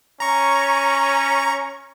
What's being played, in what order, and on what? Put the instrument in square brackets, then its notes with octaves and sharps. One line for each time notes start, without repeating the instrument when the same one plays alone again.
[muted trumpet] C#4 [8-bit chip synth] A#5 C#6